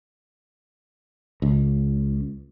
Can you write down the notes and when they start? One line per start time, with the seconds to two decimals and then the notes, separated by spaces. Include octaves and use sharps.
1.42 C#2